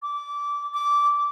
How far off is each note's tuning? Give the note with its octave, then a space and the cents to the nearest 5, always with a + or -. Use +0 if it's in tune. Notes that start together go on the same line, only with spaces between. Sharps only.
D6 -20
D6 -15